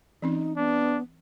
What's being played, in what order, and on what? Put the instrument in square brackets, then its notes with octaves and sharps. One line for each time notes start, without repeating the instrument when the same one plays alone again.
[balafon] E3 C4 C#4 [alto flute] D#4
[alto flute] B3 [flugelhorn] D4